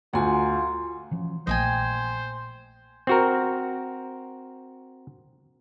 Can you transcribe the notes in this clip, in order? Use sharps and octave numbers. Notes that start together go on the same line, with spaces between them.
D2 F4 F#5 G#5 A#5 C6
E3 F3 C#4
A#1 A#2 A3 C5 D#5 G5 G#5
C4 F#4 A#4